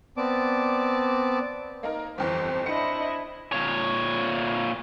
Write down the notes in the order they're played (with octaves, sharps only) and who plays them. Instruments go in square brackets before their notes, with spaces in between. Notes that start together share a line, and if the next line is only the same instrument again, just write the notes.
[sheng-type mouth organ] B3 C4 D5 A5 D6
[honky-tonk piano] A#3 D#4 A#4
[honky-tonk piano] G1 F2 E3 [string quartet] C5
[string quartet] D4 E4 D#5 [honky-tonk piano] C5 C#7
[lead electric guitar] A#2 C#5